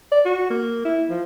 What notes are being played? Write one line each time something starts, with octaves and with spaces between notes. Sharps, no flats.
D5
F#4
A#3
E4
F3